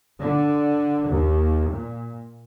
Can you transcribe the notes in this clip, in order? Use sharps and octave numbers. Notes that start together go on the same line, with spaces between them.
D3
D#2
A#2